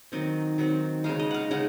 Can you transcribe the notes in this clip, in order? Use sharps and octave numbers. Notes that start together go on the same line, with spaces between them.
D#3 F#3 C4 D#5
D#3 F#3 C4
C#3 G#3 D#4 F5
D#5
F5 F#5
C#3 G#3 D#4 F#5